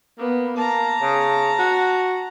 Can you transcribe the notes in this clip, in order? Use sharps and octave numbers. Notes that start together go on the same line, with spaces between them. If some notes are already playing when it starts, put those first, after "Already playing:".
A#3 B3
A#3 A5 A#5
C#3
F#4